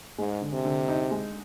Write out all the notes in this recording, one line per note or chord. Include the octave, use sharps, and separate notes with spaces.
G#2 G#3
D3
C3
D3
D#4
G#3